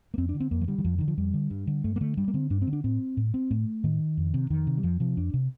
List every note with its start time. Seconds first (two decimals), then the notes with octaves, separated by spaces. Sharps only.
0.14 A#3
0.18 F2 C4
0.29 D4
0.34 D3
0.40 C4
0.51 F2 A#3
0.61 F3
0.68 D3 G3
0.78 D#3
0.84 F2 F3
0.98 D3 D#3
1.08 F3
1.17 F2 G3
1.34 D3
1.50 G2
1.67 D3
1.84 G2 A3
1.96 A#3
2.01 D3 A3
2.17 G2 G3
2.28 A#3
2.34 D3 C4
2.50 G2 D4
2.62 C4
2.67 D3
2.73 D4
2.84 A2 C4
3.17 A2
3.34 C4
3.51 A2 A3
3.84 A2 D#3
4.17 F2
4.34 C3
4.50 F2 D#3
4.67 C3
4.77 G3
4.83 F2 F3
5.00 C3 F3
5.17 F2 D4
5.34 C3